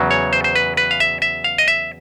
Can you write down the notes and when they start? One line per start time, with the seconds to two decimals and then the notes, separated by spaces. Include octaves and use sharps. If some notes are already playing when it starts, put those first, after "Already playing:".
Already playing: E2 C#3 F#3
0.11 C#5
0.33 C5
0.44 C5
0.55 B4
0.77 B4
0.91 F5
1.00 E5
1.22 E5
1.44 F5
1.58 D#5
1.68 E5